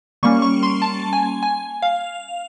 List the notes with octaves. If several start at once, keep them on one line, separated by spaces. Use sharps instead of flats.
G3 A#3 C#4 C#6
C#6
C6
A5
G#5
G#5
F5